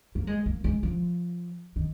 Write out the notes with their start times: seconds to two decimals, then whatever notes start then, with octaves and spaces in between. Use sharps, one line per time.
0.15 A#3
0.27 G#3
0.46 A#3
0.64 G#3
0.83 F3
1.76 D#3